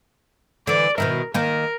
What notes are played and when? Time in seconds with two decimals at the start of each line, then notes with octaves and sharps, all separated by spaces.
0.67 D3 E3 D5
0.98 B2 D#3 E4 A#4
1.34 D#3 A#3 A#4